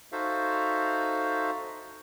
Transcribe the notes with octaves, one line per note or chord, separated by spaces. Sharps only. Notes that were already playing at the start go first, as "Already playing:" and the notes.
D#4 F#4 A4 C5 E5 F5